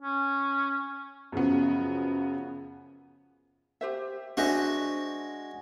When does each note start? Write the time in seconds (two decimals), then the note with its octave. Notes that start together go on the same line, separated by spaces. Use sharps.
0.01 C#4
1.32 F#2 C#3 F3 B3
3.81 G4 C5 E5
4.37 G#3 D4 F#4 C5 E5